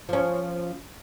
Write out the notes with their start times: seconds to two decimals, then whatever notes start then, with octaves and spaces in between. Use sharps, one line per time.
0.09 F3 C#4